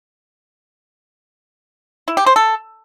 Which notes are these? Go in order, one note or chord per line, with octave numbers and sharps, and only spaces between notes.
E4
G4
C5
A4